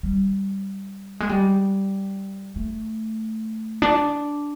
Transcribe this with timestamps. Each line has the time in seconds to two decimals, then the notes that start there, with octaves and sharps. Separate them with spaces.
0.03 G3
1.20 G#3
1.29 G3
2.56 A3
3.82 D4